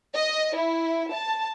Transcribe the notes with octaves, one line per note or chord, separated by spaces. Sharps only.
D#5
E4
A5